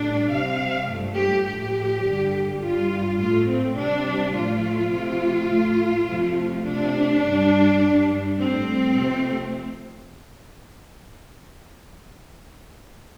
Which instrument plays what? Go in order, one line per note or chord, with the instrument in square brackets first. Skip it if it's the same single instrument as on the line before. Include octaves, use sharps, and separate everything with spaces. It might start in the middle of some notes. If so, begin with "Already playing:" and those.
Already playing: [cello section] A2 G3 D4
C3 G3 F5
G2 F3 A3
G4
A2 F3 A3 G4
G2 D3 G3
G2 G3 F4
A2 A3 F4
C4
C3 G3 D4
A2 F3 A3 F4
C3 F3 A3
A2 A3
F2 C3 F3 A3
C3 A3 D4
G2 G3
G2 G3
A2 G3 C4
F2 C3 A3